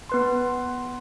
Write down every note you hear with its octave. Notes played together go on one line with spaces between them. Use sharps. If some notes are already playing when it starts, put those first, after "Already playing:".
B3 B4 C6